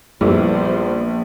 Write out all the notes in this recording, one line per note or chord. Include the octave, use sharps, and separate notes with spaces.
A#1 G3 B3 E4 G4 A4 C5